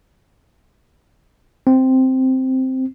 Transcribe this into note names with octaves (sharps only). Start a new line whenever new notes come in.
C4